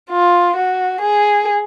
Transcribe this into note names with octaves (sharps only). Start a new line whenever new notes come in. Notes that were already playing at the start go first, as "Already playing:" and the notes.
F4
F#4
G#4